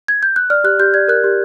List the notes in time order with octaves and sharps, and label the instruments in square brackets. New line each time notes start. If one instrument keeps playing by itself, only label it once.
[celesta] G#6
G6
F#6
D5 F6
G4 F#6
G4 G6
D5 G#6
A#4 F#6
G4